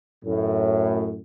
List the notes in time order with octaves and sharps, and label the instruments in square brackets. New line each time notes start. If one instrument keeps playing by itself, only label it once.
[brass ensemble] F#2 A2